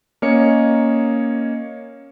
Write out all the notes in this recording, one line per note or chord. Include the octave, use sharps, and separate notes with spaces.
A#3 C#4 C#5 D#5 C#7